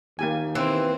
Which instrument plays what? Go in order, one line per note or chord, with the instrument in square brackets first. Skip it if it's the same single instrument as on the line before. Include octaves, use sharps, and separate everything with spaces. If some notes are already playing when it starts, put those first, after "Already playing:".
[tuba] D#2 [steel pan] A#3 G4 G#5
[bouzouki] E3 [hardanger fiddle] C4